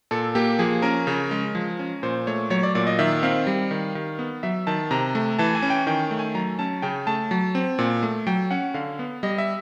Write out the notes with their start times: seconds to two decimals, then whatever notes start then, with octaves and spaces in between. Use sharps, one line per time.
0.11 A#2 A4
0.35 A#3 G4
0.59 F3 G#4
0.82 C#4 A#4
1.07 C#3
1.31 G#3
1.55 F3
1.79 C#4
2.03 A#2 C5
2.27 A3 C#5
2.50 F#3 C#5
2.63 D5
2.75 A#2 D5
2.87 D#5
2.99 D#3 E5
3.23 C4 F5
3.47 G3
3.71 D#3
3.95 D#3
4.19 B3
4.43 F#3 E5
4.67 D#3 A5
4.91 C3 A#5
5.15 A3
5.39 E3 A5
5.55 G#5
5.62 C#4
5.70 G5
5.87 D#3 G5
6.11 A3
6.19 G#5
6.34 F#3 A#5
6.59 C#4 A5
6.82 C#3 G5
7.07 A3 A5
7.31 F#3
7.55 C4
7.79 A#2
8.03 A3
8.27 F#3 G5
8.51 C#4 F#5
8.74 D3 F5
8.99 B3
9.23 G3 D#5
9.38 E5